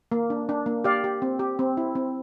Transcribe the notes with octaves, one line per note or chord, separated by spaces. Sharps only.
A#3
D4
D4
A#3
G4 D5 F5
G4
C4
G4
C4
E4
C4